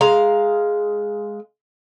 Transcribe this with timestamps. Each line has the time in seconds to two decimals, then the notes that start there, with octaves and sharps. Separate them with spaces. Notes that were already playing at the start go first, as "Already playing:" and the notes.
0.01 G#3 F5 A#5